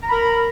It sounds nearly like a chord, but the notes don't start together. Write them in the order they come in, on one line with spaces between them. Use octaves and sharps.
A#5 B5 A#4